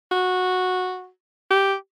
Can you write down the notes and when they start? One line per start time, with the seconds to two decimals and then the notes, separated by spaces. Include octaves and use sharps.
0.12 F#4
1.51 G4